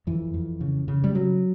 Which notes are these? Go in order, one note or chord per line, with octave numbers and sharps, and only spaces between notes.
F2 E3
F2
C#3
C#3
G3
C#3 F#3